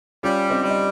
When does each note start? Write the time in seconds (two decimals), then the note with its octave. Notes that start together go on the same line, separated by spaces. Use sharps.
0.23 G3 C#4 F4
0.50 C4 D#4
0.63 G3
0.69 D#4